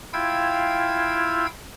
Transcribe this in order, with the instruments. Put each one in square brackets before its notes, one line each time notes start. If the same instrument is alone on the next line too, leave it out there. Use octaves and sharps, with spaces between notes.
[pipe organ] E4 F4 F5 G5 E6 G#6